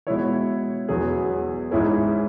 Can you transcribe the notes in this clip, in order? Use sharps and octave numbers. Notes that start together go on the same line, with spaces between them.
B2 G#3 E4 C#5
E2 B2 F#3 C#4 G#4
G#2 E3 C#4 E4 G#4